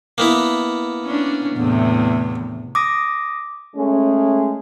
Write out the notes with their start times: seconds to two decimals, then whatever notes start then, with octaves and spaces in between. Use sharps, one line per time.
0.18 A#3 B3 E4
1.05 C#4 D4
1.57 E2 A2 C3
2.75 D6 D#6 A#6
3.76 G#3 A3 C#4